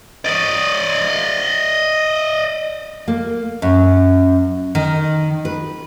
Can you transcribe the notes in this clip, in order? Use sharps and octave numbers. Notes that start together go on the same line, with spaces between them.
D5 D#5
A#3
F#2
D#3
B4